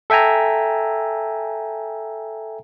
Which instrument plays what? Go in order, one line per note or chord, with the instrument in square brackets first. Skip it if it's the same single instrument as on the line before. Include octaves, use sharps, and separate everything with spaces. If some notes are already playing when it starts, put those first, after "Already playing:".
[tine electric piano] A4 E5 G5 G#5 A#5